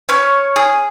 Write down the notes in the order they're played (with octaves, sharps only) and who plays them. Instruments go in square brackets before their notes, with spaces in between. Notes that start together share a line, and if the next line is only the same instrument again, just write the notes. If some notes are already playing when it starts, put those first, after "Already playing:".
[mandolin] C#4 C#5
G#4